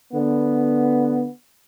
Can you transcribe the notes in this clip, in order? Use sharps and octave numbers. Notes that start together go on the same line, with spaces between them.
D3 B3